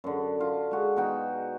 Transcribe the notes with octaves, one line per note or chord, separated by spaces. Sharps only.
F#2 D3
F4
G#3 F#4
B2 D#4 F#4 G5